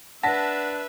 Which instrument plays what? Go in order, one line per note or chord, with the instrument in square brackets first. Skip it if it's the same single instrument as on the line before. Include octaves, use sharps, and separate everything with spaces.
[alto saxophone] D4 [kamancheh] B4 E5 [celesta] F#5 A#6 [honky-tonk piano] A5 B6